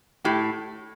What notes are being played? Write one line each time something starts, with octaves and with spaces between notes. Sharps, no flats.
A2 G4